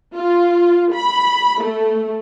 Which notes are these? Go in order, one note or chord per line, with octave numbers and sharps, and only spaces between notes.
F4
B5
A3